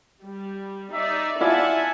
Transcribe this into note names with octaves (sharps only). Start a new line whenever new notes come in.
G3
D#4 D5 E5
E4 F4 D5 E5 F#5 G#5 A5